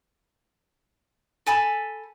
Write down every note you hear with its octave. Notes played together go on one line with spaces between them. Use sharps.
A4 G#5 A5 B5